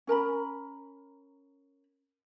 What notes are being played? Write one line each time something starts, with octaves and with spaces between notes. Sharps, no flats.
C#4 A#4 A#5 B5